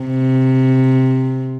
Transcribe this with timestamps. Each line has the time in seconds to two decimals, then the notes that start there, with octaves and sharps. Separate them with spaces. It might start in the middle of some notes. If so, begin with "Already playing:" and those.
Already playing: C3